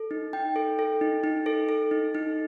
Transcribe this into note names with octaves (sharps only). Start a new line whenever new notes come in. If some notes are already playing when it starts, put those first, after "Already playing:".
Already playing: A4
D#4
D#4 G5
A4
A4
D#4
D#4
A4
A4
D#4
D#4